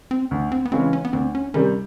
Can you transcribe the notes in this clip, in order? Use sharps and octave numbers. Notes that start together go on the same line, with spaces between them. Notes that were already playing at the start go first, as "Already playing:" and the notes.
C4
D2
C4
B3
C#3 E3 G#3 C4 C#4
C#4
B3
D2 C4
C#4
C3 D#3 G3 C#4